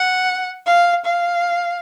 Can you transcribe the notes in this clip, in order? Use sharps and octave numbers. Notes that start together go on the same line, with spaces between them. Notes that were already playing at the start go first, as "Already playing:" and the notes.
Already playing: F#5
F5
F5